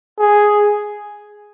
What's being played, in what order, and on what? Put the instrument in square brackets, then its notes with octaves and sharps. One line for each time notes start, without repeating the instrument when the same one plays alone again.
[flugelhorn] G#4